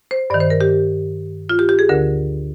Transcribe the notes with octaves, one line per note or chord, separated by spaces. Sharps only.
C5
G2 D#3 D5
C5
A#4
G4
F4
G4
G4
G#4
D2 D3 A#4